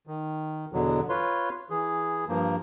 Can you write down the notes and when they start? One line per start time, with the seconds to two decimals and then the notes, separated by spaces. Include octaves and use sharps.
0.07 D#3
0.73 E2 B2 D3 F#3
1.09 F4 B4 C#5 C6
1.70 E3 G#4
2.28 G2 F3 A#3